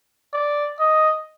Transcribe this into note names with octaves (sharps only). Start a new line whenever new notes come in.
D5
D#5